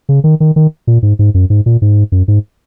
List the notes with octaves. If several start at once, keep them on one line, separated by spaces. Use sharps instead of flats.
C#3
D#3
D#3
D#3
A#2
G#2
G#2
F#2
G#2
A#2
G#2
F#2
G#2